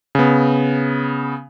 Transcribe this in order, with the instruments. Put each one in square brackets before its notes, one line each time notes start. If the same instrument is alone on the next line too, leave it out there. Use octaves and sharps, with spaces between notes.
[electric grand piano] C#3 B3